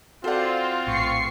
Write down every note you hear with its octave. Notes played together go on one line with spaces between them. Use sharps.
C4 F4 F#4 A4 C5 D5 F#5
A#1 A2 C#6 C7